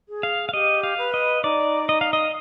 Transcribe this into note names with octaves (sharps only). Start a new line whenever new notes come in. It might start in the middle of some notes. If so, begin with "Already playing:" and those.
G#4
F5
F5
G4 D#5
F5
B4
D#5
D#4 D5
D#5
F5
D#5